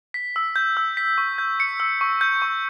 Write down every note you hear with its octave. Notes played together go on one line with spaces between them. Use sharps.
B6
E6
G6
E6
B6
C#6
G6
C#7
E6
C#6
G6
C#6